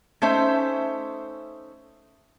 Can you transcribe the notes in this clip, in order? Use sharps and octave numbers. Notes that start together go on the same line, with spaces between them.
A3 C#4 D#4 C5 E5